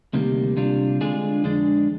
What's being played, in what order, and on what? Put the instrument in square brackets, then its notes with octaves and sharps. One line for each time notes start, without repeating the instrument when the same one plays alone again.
[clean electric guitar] D2 C3 D#3 G3 A#3
C3 G3 D4 F4
D3 G#3 D4 F4 G#4
F2 D3 G#3 D4